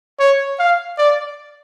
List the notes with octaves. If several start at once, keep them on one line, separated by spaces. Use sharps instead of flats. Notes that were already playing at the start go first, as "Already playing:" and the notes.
C#5
F5
D5